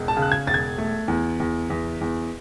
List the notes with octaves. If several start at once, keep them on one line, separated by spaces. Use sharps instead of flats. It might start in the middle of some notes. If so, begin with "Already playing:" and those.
Already playing: E1 C#2
A5
C#3
F#6
G#6
E1 A6
G#6
A3
E2
E2
E2
E2